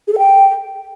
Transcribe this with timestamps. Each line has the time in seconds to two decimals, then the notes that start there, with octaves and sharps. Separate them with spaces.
0.07 G#4
0.13 A4
0.18 G5